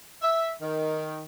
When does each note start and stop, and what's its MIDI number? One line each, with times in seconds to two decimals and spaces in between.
0.22 0.50 76
0.61 1.25 51